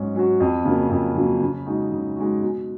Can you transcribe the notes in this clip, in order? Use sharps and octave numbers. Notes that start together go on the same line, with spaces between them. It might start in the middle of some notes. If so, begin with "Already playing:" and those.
Already playing: G#2 F#3 C#4 F#4
F#3 C#4 F#4
F2
C#3 F#3 A#3
F2
C#3 F#3 A#3
C#3
G#3 D#4 F#4
C#3
G#3 D#4 F#4
B2